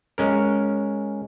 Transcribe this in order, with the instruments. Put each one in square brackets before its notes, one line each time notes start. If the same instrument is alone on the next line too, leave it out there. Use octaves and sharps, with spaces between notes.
[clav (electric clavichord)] G#3 C#4 A#4